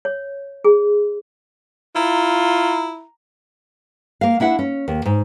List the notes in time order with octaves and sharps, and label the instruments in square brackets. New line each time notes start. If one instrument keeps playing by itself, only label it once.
[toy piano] C#5
G#4
[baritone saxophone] E4 [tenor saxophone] F4 [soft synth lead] A#5
[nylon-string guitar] A#3 F5
D4 E4 E5 F#5
C#4
D#2
G#2